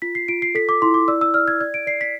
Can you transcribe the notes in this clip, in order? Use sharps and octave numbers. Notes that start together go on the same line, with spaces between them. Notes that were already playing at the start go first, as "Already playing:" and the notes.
F4 B6
C7
F4 D7
C7
A4 B6
D6
E4 C6
D6
D5 E6
E6
D5 F6
G#6
D5 G#6
D7
D5 C7
B6